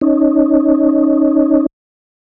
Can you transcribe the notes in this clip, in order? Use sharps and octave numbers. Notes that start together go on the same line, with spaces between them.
C#4 D#4